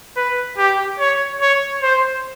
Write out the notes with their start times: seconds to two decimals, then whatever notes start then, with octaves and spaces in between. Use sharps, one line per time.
0.16 B4
0.58 G4
0.99 C#5
1.41 C#5
1.82 C5